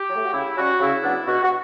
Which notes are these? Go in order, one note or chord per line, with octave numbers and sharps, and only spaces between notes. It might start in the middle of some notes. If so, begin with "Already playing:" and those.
Already playing: G4
F#3
A3
F#4
C#3 E4
G3 C#4 F#4
C#3 E4
F#3 B3 D4
B2 F#4
F#4